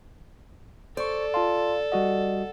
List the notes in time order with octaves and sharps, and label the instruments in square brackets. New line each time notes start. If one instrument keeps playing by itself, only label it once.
[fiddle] A4 [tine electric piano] C5 C#6 [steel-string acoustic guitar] D5
[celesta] F4 A5 C6 [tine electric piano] F5
[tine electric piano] G3 F#4 D#5 [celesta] F#5